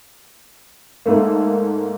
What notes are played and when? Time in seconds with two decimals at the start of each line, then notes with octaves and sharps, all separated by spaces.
1.06 G#2 A3 A#3